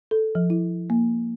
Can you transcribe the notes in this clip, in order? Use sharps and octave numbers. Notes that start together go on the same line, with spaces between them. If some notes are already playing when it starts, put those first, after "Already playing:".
A4
F3
E4
A#3